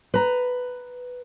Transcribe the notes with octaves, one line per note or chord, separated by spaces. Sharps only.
B4 A#5